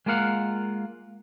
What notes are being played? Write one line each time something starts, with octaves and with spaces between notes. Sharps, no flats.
G#3 A#3 F4 A#4 F5 F#5